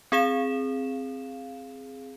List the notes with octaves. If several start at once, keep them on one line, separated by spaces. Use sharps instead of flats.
C4 G#4 F5 E7